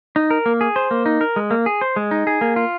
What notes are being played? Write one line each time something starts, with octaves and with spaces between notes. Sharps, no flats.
D#4
A#4
A#3
G#4
C5
A#3
D#4
A#4
G#3
A#3
G#4
C5
G#3
D#4
G#4
A#3
F4